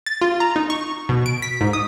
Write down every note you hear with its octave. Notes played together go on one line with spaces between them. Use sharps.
A6
F4
A#5
D#4
C#6
B2
D7
B6
G#2
D#6